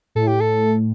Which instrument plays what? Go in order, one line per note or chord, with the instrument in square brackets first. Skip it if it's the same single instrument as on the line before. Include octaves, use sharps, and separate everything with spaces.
[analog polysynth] A2 [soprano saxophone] A4
[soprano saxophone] G4
A4